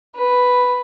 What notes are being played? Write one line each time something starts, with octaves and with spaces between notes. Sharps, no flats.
B4